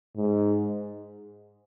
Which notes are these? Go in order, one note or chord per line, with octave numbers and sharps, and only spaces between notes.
G#2